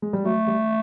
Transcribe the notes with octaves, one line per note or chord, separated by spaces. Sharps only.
G#3
G3
F#3 A3
G3